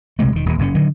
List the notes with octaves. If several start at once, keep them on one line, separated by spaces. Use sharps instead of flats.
B1 C3 G#3 A3
E1 D#3
D#1 D#2 A#2 D#3
F#1 G2 D3 C#4
D3 D#3 F#3